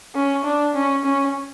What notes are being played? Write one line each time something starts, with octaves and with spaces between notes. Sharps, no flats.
C#4
D4
C#4
C#4